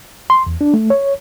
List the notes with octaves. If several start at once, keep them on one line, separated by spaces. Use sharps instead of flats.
C6
E2
D4
A3
C#5